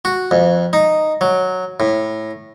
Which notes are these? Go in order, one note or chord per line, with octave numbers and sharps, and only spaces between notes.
F#4
F2
D#4
F#3
A2